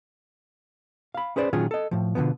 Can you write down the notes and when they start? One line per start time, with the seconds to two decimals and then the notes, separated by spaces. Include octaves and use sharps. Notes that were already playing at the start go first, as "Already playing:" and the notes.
1.14 F5 B5
1.36 C#4 G#4 B4 C5 D5
1.53 A#2 D#3 F#3 C#4 F4 G#4
1.71 A4 D#5
1.91 A2 F3
2.15 B2 D3 E3 F3 B3